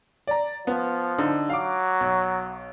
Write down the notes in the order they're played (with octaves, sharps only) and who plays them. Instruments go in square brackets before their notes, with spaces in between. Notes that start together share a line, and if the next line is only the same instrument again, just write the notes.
[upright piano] D5 A#5
[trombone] F3 [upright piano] B3
[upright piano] D3 D#4
[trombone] F#3 [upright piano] F5 D6
[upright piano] B1